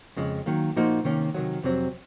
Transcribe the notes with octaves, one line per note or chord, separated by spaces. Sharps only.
F2 C#3 G#3
D#3 F#3 A#3
A#2 F3 A#3 D#4 F#4
C3 D#3 A#3 C#4
C3 D#3 F#3
F2 C3 F#3 C4